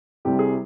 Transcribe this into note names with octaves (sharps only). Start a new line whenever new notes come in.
C2 C3 G3 G4
G#4